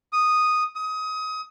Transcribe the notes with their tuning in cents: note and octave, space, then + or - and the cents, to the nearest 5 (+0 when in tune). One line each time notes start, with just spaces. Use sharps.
D#6 -5
D#6 +25